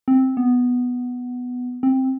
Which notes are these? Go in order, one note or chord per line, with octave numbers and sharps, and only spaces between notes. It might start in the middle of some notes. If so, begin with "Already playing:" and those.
C4
B3
C4